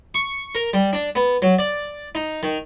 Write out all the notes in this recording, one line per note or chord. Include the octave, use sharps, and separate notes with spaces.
C#6
A#4
G3
D4
B3
F#3
D5
D#4
D#3